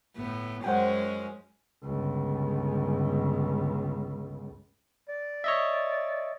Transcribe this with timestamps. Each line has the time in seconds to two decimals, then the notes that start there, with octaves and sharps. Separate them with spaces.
0.17 G1 A2 B3
0.64 F#2 G#3 C#4 C5 F#5 G5
1.83 G1 C#2
5.09 D5
5.44 C#5 D#5 E5